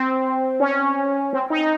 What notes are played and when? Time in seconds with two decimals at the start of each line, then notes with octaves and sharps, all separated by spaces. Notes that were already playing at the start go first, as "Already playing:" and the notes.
Already playing: C4
0.60 C#4
1.33 C4
1.50 D#4